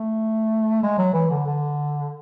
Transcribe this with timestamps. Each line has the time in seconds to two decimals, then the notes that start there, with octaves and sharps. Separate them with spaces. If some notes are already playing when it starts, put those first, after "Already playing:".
Already playing: A3
0.83 G#3
0.98 F#3
1.14 E3
1.30 D3
1.46 D3